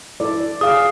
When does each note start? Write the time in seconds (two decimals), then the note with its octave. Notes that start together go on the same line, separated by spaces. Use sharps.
0.20 E4 A4 D5
0.61 G#4 F5 D#6